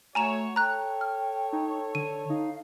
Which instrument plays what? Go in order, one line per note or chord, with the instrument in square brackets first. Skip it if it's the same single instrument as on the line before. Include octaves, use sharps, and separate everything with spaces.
[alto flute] A3 [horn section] F#4 C#5 [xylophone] G#5 A#5 E7
[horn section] A4 C#5 [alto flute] G5 [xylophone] A#5 F#6
[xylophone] F6
[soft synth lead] D#4
[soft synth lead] D3 [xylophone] D#7
[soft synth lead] D#4 [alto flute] F5